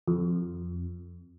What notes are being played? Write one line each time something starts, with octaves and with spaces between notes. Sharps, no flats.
F2